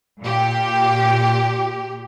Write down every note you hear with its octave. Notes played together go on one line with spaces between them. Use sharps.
A#2 G4